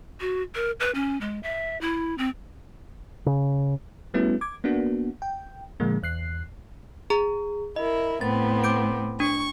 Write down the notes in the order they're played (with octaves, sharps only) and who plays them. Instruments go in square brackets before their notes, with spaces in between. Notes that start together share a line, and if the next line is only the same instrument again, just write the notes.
[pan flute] F#4
A#4
B4
C#4
G#3
E5
E4
C4
[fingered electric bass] C#3
[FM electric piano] G3 A3 B3 C#4 E4 F#4
D6 G#6
A#3 B3 D4 F#4
G5
A#2 D3 F3 G#3 A#3
E2 F#6 C7
[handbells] G#4 A#5
[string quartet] E4 A#4 [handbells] D#5
[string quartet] A2 B3 C4 [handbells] A6
[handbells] D6 G6 D7
[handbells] D4 [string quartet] C#6